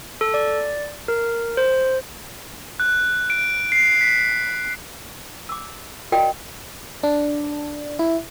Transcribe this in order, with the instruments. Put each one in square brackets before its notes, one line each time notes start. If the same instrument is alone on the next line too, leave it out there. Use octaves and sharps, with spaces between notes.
[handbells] A4
D5
A#4
C5
[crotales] F#6
D7
C7
B6
[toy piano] D6 E6
F#4 A#4 D5 D#5 G5
[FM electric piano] D4
E4